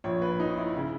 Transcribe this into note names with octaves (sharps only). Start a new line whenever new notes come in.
A#1 A#2 C#5
B4
D#4
E4
C#3 E4